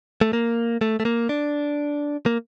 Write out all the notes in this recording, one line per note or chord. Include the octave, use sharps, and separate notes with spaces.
A3
A#3
A3
A3
A#3
D4
A#3